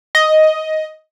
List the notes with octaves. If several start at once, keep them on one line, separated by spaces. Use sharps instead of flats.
D#5